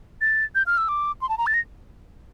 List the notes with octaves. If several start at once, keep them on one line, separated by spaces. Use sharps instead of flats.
A6
G6
F6
E6
D6
C6
A5
A#5
A6
A#6